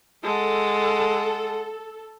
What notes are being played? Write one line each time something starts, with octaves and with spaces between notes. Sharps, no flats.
G#3 A4 F#5